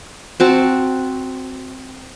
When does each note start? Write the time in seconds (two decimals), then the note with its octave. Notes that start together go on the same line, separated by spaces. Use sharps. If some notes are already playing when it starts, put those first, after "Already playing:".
0.40 C4 F#4 A5